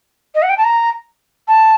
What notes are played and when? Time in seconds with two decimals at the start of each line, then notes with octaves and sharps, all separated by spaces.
0.35 D#5
0.42 F#5
0.50 G5
0.58 A5
0.64 A#5
1.48 A5